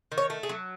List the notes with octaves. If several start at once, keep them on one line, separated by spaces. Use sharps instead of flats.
D#3
C#5
A3
G#4
F#3